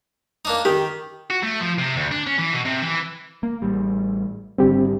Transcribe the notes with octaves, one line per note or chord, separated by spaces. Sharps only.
A#3 D4 D#4
D#3 G4
F#4
A3
F3
C3
D2
D4
C#4
E3
B2
C3
E3
A#3
A1 G3
G#1 D3 G3 C4 G4